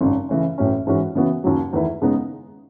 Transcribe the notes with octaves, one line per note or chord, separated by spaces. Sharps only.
G#1 F#2 C#3
C#3 E3 A3 C#4
A1 A2 F#3 C#4
G#2 E3 G#3 C#4 F#4
C#3 E3 B3 F#4
D#2 C#3 F#3
E2 D#3 A3 E4 B4
C#3 G#3 B3 D#4